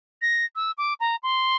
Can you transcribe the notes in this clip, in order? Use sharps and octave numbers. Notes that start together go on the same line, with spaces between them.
A#6
E6
D6
A#5
C6